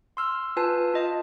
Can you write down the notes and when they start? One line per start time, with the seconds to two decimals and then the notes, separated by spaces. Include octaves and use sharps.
0.17 C6 E6 F6
0.57 F4 B4 G#5 A5
0.94 F4 D#5 A5